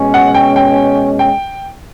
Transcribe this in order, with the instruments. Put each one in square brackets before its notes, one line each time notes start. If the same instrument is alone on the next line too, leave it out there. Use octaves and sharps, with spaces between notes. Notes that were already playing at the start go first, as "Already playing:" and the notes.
Already playing: [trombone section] B2 G#3 C#4
[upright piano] F#5
G5
G5
G5